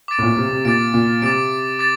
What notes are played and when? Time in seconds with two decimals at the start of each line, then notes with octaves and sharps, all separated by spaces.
0.08 D6 A6 D7
0.18 A2
0.23 A#2
0.37 C3
0.51 C3
0.65 A#2 D6 A6 D7
0.94 A#2
1.22 C3 D6 A6 D7
1.79 D6 A6